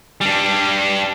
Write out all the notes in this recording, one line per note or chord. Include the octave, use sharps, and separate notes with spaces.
G3 D4